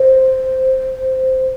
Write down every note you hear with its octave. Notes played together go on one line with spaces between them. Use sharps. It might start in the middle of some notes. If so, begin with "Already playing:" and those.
Already playing: C5